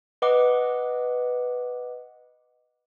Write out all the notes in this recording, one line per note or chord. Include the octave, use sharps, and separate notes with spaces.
B4 D#5 F#5 D6